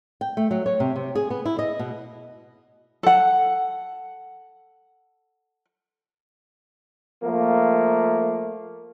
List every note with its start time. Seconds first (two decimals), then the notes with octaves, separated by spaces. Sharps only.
0.21 G5
0.37 A3
0.51 F#3
0.66 C#5
0.80 C3
0.96 C3
1.15 G#4
1.30 B3
1.45 E4
1.59 D#5
1.79 B2
3.03 A4 F#5
7.23 F3 A3 A#3